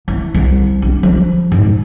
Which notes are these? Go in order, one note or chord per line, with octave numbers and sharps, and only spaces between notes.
E3
C2
D4
F3
G#2